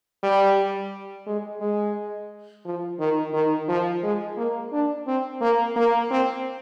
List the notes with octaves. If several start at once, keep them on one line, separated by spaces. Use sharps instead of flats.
G3
G#3
G#3
F3
D#3
D#3
F3
G#3
A#3
D4
C4
A#3
A#3
C4